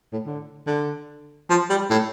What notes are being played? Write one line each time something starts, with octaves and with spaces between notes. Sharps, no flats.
A2
D3
D3
F3
G3
A2